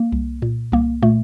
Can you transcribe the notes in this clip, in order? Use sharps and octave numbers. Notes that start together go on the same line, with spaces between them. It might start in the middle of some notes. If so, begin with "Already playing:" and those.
Already playing: A#3
C2
A#2
C2 A#3
A#2 A3